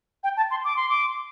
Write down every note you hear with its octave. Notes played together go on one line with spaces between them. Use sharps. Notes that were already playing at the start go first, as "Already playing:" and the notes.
G5
A5
C6
D6
C6
D6